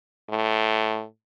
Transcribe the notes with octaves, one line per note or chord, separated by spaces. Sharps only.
A2